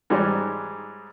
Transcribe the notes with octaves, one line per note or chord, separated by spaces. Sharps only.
G#2 G3 G#3 D#4 C#5